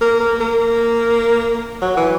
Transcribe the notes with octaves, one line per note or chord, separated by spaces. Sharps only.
A#3
A#3
A#3
F#3
E3